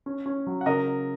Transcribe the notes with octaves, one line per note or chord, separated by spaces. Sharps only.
C#4
C#4
F#3
F#5
C#3 A#4 D#5